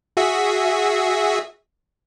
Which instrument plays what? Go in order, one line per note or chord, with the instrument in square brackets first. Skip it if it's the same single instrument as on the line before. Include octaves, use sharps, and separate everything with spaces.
[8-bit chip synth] F#4 G#4 E5